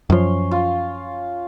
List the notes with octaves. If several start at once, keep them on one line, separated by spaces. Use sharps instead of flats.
F#2 F3 C#4 C6
F4